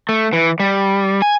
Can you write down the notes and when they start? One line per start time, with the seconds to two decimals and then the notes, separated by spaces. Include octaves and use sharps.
0.09 A3
0.33 E3
0.60 G3
1.22 G#5